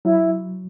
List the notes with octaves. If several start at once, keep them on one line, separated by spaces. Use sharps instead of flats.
F#3 E4